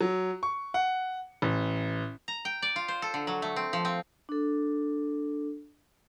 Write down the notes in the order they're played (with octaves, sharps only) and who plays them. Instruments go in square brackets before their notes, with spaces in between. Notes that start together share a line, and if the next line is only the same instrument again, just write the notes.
[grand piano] F#3
C#6
F#5
A1
[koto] A#5
G5
D5
F4
C5
A4
D3
F#3
A3
C4
F3
C4
[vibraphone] D4 A4